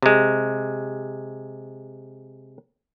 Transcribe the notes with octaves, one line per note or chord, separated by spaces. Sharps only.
C3 G#3